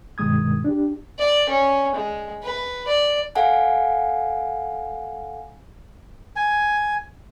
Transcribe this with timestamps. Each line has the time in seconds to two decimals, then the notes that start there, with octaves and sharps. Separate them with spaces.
0.18 G2 B2 D#3 G#3 D#6 G#6
0.64 D4 G4
1.19 D5
1.49 C#4
1.95 G#3
2.43 B4
2.87 D5
3.35 A4 F5 F#5 G#5
6.36 G#5